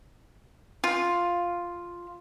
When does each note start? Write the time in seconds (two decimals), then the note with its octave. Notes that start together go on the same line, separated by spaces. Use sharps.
0.84 F4